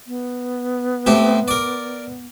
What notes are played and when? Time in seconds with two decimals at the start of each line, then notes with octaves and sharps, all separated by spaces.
0.07 B3
1.06 A2 C4 G4
1.48 A#4 D5